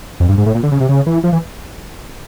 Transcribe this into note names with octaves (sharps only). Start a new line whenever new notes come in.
F2
G2
G#2
A2
A#2
D3
C#3
C3
C#3
E3
F3
E3